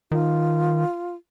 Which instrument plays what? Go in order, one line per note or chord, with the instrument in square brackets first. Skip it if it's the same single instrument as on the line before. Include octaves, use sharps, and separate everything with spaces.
[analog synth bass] D#3 [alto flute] F4